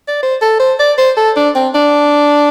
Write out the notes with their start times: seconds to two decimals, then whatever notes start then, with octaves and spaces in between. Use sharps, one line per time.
0.08 D5
0.22 C5
0.41 A4
0.60 C5
0.79 D5
0.98 C5
1.17 A4
1.36 D4
1.55 C4
1.74 D4